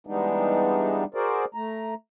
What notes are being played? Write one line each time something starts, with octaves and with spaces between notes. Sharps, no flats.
E3 G3 G#3 B3 D4 D#4
F#4 G#4 A#4 C5 D5
A3 A#5